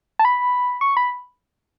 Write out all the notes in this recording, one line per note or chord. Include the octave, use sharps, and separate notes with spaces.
A5
B5
C#6
B5